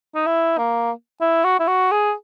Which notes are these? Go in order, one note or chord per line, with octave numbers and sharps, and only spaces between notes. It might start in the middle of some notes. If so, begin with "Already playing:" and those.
D#4
E4
A#3
E4
F#4
E4
F#4
G#4